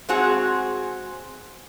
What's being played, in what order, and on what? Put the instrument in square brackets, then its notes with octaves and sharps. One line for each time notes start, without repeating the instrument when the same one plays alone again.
[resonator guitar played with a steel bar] G#3 C4 F#4 G#4